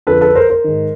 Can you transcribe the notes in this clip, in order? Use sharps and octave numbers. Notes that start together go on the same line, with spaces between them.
F2 D3 F3 A4 B4
A4 B4
A#4 C5
A#4 C5
G#2 D#3